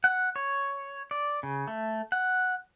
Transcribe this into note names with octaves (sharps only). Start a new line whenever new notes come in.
F#5
C#5
D5
C#3
A3
F#5